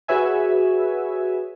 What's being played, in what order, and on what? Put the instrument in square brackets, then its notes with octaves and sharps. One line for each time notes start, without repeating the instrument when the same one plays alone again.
[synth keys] F#4 G#4 B4 C#5 E5 G#5